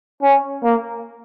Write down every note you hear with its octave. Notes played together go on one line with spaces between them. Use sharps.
C#4
A#3